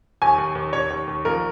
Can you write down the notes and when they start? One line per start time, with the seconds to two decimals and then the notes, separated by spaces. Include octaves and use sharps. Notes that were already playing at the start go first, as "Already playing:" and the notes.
0.22 D#2 G#5
0.38 D#2
0.55 D#2
0.73 D#2 C#5
0.90 D#2
1.07 D#2
1.25 A#1 A#4